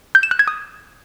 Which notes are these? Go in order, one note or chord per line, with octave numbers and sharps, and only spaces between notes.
G6
E7
F#6
G#6
D#6